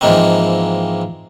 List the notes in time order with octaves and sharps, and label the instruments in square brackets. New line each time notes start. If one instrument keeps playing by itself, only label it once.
[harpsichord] G#2 E3 F3 G#3 A#3 C4